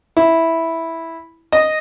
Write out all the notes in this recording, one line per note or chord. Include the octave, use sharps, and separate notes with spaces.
E4
D#5